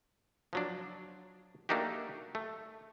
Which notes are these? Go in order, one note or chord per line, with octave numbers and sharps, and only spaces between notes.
F3 F#3 D4
A3 A#3 D4 D#4 F#4 G4
A3